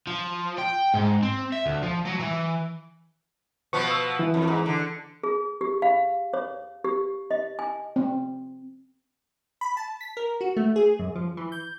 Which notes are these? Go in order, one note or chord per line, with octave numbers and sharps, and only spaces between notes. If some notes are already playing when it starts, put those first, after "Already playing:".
F3
G5
G#2
C4
E5
D2
F3
F#3
E3
B2 F3 B3 C#6
E6
E3
F2
G#2
D3
G#4
G4
F5
C#5
G4
D#5
G#5
C4
B5
A5
B6
A#4
F#4
A3
G#4
F#2
F3
E3
G6